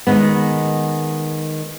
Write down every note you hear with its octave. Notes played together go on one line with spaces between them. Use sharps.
D#3 G#3 B3